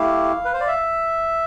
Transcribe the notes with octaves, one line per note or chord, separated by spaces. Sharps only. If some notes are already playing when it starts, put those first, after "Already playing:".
Already playing: A3 E4 G4 F5
B4
C5
D5
E5